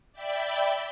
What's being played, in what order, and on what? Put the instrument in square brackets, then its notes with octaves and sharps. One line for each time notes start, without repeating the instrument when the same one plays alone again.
[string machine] D5 E5 G5 B5